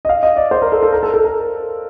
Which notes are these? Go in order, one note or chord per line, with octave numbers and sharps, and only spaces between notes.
D#5
F5
D#5
D5
C5
A#4
A4
A4
A#4
A4
A4
A#4